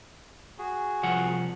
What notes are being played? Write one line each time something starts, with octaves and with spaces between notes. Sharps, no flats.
F#4 G#4
C2 F3 F#5